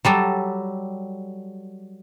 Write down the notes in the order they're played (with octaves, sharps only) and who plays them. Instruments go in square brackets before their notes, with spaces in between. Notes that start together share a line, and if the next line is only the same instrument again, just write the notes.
[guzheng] F#3 G3 A4